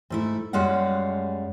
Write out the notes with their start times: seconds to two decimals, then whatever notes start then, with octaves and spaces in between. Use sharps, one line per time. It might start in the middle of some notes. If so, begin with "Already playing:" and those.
0.10 G#2 A3 E4
0.53 F#2 G3 G#3 F5 F#5